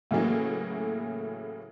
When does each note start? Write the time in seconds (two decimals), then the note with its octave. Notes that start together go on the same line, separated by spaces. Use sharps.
0.11 A2 C#3 E3 F#3 A3 A#3